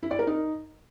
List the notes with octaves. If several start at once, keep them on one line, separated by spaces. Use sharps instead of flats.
E4
D5
A#4
D#4